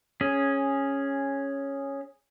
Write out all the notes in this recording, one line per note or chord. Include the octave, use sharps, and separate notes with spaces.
C#4 G#4